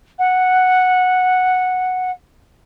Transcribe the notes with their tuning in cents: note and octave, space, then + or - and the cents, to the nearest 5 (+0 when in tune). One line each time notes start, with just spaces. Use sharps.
F#5 -5